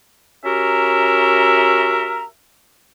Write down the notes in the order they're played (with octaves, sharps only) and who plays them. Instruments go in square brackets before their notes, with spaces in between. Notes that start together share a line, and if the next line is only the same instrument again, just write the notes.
[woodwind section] C#4 F#4 G4 A#4 E5 A#5